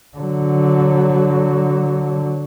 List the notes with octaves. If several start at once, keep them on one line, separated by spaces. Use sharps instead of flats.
D3 F#3